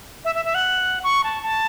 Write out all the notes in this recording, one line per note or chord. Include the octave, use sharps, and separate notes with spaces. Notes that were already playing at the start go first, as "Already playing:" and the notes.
E5
E5
E5
F#5
C#6
A5
A5